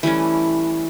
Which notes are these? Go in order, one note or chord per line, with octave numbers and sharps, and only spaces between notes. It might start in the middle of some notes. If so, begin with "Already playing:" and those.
E3 G3 A3 C#4